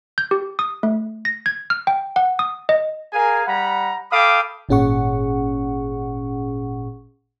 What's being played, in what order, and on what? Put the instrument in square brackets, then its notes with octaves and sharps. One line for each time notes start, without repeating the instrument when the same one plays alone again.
[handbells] G6
G4
D#6
A3
A#6
G#6
F6
G5
F#5
D#6
D#5
[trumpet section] G#4 A#4 F5 G#5
G3 F#5 A#5 B5
A4 F5 G5 B5 D6 D#6
[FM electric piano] G#1 A#2 C#4 G#4 F#5 C#6